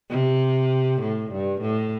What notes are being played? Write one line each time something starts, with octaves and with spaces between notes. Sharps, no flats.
C3
A2
G2
A2